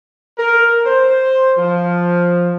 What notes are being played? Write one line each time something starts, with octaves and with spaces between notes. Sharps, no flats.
A#4
C5
F3